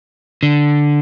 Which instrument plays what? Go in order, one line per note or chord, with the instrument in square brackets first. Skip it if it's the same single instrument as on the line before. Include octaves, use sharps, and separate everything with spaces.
[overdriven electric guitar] D3